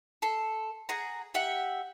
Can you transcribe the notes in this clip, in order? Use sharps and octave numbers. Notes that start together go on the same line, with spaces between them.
A4 C6
G#4 F#5 A#5
G4 E5 F#5